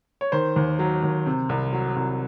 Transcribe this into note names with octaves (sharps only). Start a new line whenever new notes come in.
C#5
D#3 C5
D#2
F#3
D#2
C3
C2
F#3
C2